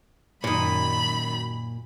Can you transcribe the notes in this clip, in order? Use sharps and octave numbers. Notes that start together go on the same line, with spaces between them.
F#2 A#2 D#3 D#4 B5